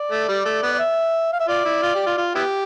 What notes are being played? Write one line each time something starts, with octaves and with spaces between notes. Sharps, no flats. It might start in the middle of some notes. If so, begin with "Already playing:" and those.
Already playing: D5
A3
G3
A3
B3
D5
E5
F5
E5
F4 D5
E4
F4
G4
F4
F4
B3 E4 G4